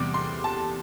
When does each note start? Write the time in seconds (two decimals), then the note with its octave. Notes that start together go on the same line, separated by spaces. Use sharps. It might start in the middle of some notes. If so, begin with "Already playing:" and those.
Already playing: E2 C3 G3 D6
0.14 C6
0.44 A5